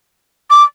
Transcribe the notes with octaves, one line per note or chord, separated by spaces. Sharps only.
D6